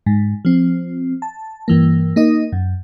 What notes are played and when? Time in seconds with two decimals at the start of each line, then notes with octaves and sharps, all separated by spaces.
0.06 G#2
0.45 F3 C4
1.22 A5
1.68 G2 E3 A#3
2.16 A#3 D#4 D#5
2.52 F#2